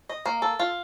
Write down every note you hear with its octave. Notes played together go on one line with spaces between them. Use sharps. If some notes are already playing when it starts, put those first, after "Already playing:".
D#5
A#3
A4
F4